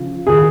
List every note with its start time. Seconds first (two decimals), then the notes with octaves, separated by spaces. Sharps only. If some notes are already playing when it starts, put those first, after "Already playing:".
Already playing: C#3 F3
0.27 D#3 G#4